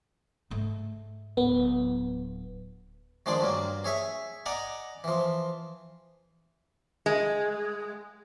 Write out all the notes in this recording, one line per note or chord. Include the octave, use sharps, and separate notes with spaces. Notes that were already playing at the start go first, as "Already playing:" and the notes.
G#2 A3
D1 B3
D#3 F3 G#3 D4 G#4 D5
G2 F#3 A#3
G#4 C#5 E5 G#5
D5 D#5 F#5 G#5 A#5
E3 F3
G#3